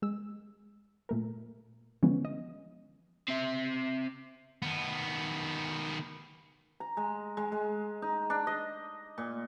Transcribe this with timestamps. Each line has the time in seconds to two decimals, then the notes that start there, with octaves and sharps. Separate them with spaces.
0.02 G#3 E6
1.09 A#2 A3 A#4
2.03 D3 E3 F3 G#3 B3 C#4
2.25 D#5
3.28 C4 E5
4.62 D#3 B3
6.80 A#5
6.97 G#3
7.37 G#3
7.52 G#3
8.02 D#4
8.30 D4
8.47 D#5
9.18 A#2